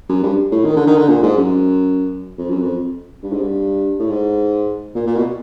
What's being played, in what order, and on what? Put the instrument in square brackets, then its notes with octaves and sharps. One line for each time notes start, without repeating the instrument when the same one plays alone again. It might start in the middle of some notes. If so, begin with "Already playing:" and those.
[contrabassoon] F#2
G2
A2
D#3
D3
D#3
D3
A#2
G#2
F#2
F2
F#2
F2
G2
G#2
G2
A2
G#2
A#2
A#2
B2